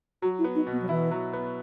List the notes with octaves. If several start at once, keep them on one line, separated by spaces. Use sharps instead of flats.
F#3 F#4
E4
B3
D#4
B2
B3
F#3
E3 E4
F#3
B3